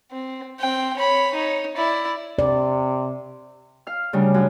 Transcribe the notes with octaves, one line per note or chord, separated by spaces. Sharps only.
C4
C4 G5
C#5 B5
D#4 C#5
E4 D5
C3 D5
F5 F6
D2 C#3 G3 D4
F#2 D4